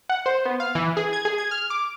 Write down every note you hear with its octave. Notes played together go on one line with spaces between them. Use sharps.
F#5
C5
B3
F5
E3
G#4
G#6
G#4
G#6
F6
D6